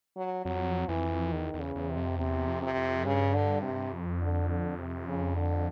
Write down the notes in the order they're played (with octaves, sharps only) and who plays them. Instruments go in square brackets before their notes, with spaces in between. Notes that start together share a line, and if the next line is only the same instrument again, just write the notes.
[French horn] F#3
[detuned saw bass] F2 [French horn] F#3
[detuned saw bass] F2 [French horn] E3
[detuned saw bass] E2 [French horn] D#3
[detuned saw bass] E2
[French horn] C#3
[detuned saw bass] E2
[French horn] C3
[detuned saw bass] F2
[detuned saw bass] E2 [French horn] C3
[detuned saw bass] F2
[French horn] C3
[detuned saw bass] F2
[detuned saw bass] G2 [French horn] C#3
[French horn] D3
C3
[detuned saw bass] F2
[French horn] D3
D3
C3
C#3
D3